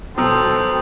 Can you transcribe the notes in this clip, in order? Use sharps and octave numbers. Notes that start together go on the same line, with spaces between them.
B2 F#3 A4 C5 G5 D#6 E6